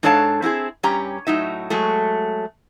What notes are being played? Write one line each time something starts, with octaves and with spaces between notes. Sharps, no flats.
G#2 D4 A4 C#5 F5 A5
C4 E4 F4 G#4
G2 C#4 G4 G5 A#5
A2 F#3 D#4 E5
F#3 G#3 A3